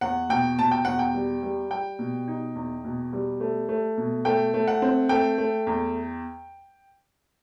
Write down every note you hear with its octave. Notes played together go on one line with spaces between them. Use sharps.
E2 F#5
B2 G5
B2 A5
G5
E2 F#5
G5
G3
G3
G3 G5
B2
D#4
E2
B2
G3
A3
A3
B2
A3 G5
A3
F#5
C4
A3 G5
A3
E2